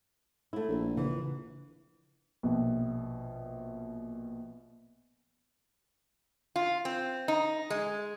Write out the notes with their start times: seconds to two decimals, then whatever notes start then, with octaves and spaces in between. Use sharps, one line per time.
0.53 A3 E4
0.69 A#1
0.97 C#3 E3
2.43 A#1 B2
6.56 F4
6.85 C4
7.28 D#4
7.70 G#3